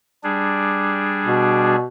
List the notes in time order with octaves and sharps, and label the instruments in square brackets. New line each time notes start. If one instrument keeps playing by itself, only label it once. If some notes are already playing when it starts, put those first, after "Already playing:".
[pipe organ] G3 D4 G#4
[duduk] B2